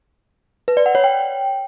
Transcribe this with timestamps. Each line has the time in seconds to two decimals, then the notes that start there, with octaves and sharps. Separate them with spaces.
0.68 B4
0.77 D5
0.86 F#5
0.95 C#5
1.04 G5